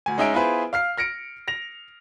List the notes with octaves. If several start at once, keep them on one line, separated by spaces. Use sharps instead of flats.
D2 G#5
G#3 C#4 D#4 E5 G#5 D7
B3 E4 F4 G#4 B4 C5
F5 F6 C7
F6 A#6 C#7 D7
A#6 F7